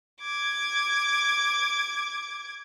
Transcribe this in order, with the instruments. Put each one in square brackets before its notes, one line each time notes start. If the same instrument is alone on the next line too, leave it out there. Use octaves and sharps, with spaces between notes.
[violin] D6 G#6